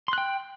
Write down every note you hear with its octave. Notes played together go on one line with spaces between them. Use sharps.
G5 C6 F#6